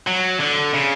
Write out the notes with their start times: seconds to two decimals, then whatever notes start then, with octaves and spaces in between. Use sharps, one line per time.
0.07 F#3
0.40 D3
0.74 C#3